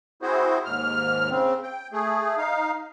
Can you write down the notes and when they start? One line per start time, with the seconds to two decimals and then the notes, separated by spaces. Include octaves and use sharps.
0.22 C4 E4 F#4 G#4 C5
0.65 D#2 G#2 F6
1.30 C#3 C4
1.63 G5
1.93 A3 G#4
2.38 D#4 F5